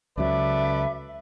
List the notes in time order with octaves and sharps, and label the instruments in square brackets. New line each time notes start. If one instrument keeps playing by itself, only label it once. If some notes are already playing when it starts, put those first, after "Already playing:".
[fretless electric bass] C#2 C#3 F#3 [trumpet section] A4 B4 D5 [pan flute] E5